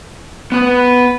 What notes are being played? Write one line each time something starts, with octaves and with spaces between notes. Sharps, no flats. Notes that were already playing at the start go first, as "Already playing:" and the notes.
B3 B4